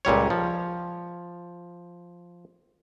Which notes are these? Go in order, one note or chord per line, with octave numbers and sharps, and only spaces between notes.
C#2 A#2 G3 C#5
F3